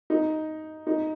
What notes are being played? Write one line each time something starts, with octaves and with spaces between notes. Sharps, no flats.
D#4
D#4